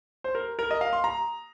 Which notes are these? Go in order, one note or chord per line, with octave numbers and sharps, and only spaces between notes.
C5
A#4
A#4
D#5
F5
C6
A#5